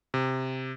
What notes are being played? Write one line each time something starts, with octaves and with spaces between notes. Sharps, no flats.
C3